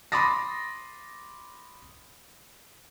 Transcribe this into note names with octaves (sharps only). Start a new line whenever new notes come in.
B5 C6 D6 D#6 A6 A#6